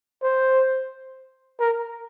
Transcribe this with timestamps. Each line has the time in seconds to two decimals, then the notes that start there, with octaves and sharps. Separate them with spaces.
0.23 C5
1.60 A#4